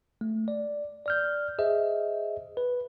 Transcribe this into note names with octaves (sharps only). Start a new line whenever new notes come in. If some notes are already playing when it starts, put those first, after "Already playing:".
A3
D5
D5 F6 G6
G#4 C5 D#5 E5
B4